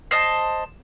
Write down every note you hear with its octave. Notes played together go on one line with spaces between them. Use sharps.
C5 D#5 A5